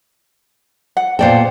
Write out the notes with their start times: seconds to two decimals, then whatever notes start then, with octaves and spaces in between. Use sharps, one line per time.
0.97 F#5
1.19 A#2 B3 A4 C5 D5 G5